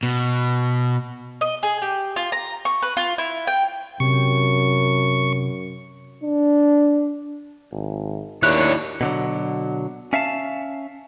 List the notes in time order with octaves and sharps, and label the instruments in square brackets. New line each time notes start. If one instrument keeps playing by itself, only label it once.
[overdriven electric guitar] B2
[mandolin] D#5
G#4
G4
F4
A#5
C#6
B4
F4
E4
G5
[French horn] F#2 [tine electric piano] C3 [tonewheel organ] C#6
[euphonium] D4
[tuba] G#1
[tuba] D#2 [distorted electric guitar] D4 E4 [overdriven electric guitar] C#5 [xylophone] F#6
[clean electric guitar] B2 D3 F#3
C#4 E5 F5 A5